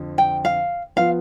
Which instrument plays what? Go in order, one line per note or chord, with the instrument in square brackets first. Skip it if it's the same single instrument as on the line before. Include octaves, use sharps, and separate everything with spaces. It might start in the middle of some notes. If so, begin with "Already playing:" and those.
Already playing: [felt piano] F2 D3 F3
[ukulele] G5
F5
[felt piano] F3 B3 F4 [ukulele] F5